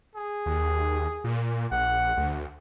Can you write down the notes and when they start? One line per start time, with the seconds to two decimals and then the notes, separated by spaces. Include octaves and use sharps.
0.15 G#4
0.46 D#2
1.24 A#2
1.72 A#1 F#5
2.17 D2